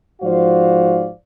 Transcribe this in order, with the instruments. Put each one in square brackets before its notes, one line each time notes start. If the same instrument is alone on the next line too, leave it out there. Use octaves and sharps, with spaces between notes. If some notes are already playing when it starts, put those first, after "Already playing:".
[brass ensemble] G#2 F3 F#4 C5 D5 F5